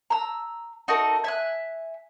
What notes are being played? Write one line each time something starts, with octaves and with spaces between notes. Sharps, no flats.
A#5 E6
D#4 F#4 A4 A#4
E5 G#5 F#6